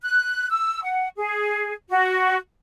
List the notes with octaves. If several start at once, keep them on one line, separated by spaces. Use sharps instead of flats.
F#6
E6
F#5
G#4
F#4